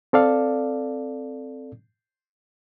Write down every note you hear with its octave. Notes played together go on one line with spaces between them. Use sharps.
C4 A4 D5 F5